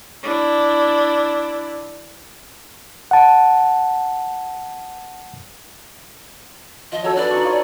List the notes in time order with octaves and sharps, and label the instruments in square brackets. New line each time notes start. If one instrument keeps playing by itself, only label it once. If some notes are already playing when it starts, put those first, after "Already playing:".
[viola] D4 E4
[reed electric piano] F#5 A5
[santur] F3 [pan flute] D#5
[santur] F#3 A4 [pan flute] C#5
[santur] D4 B4 [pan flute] D5
[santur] D#4 G5 C#6
F4 C#5 D#5